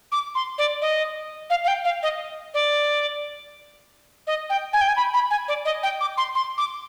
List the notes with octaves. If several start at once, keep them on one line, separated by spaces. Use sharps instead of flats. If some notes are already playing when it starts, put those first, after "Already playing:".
D6
C6
D5
D#5
F5
F5
G5
F5
D#5
D5
D#5
G5
G#5
G5
G#5
B5
B5
G#5
D5
D#5
G5
D6
C6
C6
D6